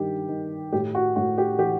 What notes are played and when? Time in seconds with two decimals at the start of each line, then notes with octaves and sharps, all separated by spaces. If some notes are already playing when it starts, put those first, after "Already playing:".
Already playing: G2 D#3 G4
0.28 D#3
0.73 A2 G4
0.95 F#4
1.16 A2 F#4
1.38 G4
1.59 E3 G4